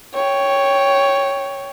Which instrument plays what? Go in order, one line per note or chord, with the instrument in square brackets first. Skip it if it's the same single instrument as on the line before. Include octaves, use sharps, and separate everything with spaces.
[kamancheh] C#5 G5